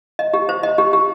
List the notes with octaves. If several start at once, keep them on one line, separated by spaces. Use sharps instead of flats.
D#5
G4
C5
D#5
G4
G4